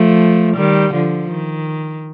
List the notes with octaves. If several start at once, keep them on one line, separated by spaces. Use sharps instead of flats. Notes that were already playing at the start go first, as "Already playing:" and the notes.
Already playing: F3 A3
D#3 G3
D3 F3
D#3